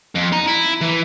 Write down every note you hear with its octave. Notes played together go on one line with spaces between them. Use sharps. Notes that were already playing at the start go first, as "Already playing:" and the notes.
F2
D#4 A#5
E4
E3